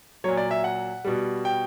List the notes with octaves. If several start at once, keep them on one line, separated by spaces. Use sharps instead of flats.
A#2 F#3 C#5
D5
E5
F#5
B2 G3
G5